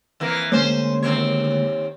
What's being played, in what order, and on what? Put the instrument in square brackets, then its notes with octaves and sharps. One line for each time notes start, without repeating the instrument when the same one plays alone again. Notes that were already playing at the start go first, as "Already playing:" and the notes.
[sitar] F2 E3 A#3
[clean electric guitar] D2 G#3 A#3 [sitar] C#4 C5
[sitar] D#2 C4 C#5